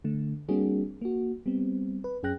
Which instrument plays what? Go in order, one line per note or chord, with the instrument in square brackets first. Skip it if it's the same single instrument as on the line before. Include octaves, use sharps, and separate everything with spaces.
[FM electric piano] D3 A3
G3 A#3 C4 D4 F#4 G#4
A#3 F#4
G3 B3 C4
B4
F#2 C#4 G#4 G5 F#6 A#6